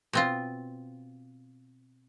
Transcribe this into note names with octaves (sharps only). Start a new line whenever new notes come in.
B2 C4 F4